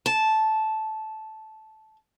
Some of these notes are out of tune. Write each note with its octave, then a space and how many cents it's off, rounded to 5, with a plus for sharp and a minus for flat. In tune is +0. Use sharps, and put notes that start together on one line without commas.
A5 -10